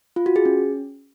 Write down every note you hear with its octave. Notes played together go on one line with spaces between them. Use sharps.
F4
F#4
G#4
C#4